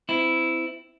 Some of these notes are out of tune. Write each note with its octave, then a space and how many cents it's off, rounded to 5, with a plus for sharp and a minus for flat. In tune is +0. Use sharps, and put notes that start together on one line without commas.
C4 -25 E4 +0